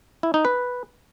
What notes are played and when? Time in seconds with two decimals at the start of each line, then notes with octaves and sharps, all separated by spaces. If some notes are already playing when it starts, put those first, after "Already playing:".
0.23 E4
0.34 D#4
0.45 B4